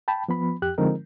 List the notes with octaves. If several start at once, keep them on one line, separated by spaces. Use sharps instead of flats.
G5 A5 B5
F3 B3 B5
F2 G4 F#6
D3 F3 G#3 C4 D#4 A#4